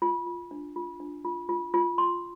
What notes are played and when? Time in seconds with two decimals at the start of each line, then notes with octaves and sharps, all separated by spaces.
0.02 F4
0.27 F4
0.51 D4
0.76 F4
1.00 D4
1.25 F4
1.49 F4
1.74 F4
1.98 C6